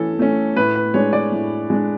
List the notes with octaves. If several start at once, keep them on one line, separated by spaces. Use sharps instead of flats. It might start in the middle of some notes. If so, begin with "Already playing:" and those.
Already playing: E3 A3 C#4 A4
A3 C#4
A2 B4
B4
G#3 D4 C#5
D5
A2
G#3 D4